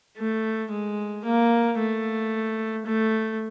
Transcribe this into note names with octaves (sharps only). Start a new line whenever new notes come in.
A3
G#3
A#3
A3
A3